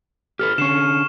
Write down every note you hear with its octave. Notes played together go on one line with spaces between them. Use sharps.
G4 A4 B4 F6
D3 C#4 C#6 C7 E7